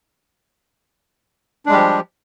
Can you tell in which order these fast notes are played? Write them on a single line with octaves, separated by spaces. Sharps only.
D4 G#3 G3 G4 F3